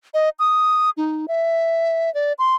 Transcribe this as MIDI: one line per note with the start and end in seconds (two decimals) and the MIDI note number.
0.14 0.29 75
0.39 0.90 87
0.97 1.26 63
1.28 2.12 76
2.14 2.33 74
2.39 2.55 84